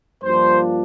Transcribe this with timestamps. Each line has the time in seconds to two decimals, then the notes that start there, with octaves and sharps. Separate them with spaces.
0.23 G2 F3 A#3 D4 F4 C5